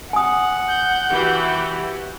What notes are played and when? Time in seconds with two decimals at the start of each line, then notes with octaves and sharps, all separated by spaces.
0.13 F#5 G#5 D#6
0.68 G6
1.09 E3 F#4 G4